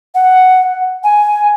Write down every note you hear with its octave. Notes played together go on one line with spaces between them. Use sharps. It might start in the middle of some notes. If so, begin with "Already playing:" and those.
F#5
G#5